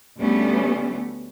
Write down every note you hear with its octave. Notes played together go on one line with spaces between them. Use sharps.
D2 G3 A3 B3 C#4